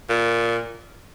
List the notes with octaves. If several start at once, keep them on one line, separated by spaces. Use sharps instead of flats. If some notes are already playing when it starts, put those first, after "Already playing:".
A#2